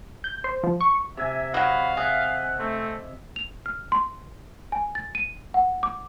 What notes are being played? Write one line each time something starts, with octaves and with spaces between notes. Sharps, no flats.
G6
C5
F3
C#6
C3 E5 G#5
F#3 F#4 D#5 F5 B5
G#4 D#5 E5 F#5
A3 C4
F7
F6
C6
G#5
A6
D#7
F#5
D6